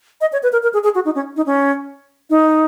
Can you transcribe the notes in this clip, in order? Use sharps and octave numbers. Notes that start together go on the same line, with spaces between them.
D#5
C#5
B4
A#4
A#4
G#4
G#4
F#4
D#4
C#4
D#4
C#4
D#4